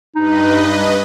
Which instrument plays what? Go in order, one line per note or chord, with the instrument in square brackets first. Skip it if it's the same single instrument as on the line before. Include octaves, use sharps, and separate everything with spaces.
[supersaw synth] G2 B4 D#5 [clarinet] D#4